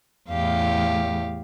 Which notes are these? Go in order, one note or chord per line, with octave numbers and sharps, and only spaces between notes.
E2 A2 G4 F5